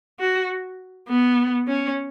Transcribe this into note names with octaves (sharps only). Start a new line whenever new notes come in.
F#4
B3
C#4